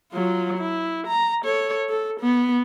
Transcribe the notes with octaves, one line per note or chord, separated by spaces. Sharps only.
F#3 F4
E4
A#5
A4 C#5
A4
B3